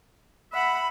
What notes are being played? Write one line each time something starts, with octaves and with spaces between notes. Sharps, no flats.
E5 F#5 B5